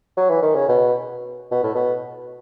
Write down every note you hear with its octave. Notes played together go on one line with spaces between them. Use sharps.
F#3
E3
D#3
C#3
B2
B2
A2
B2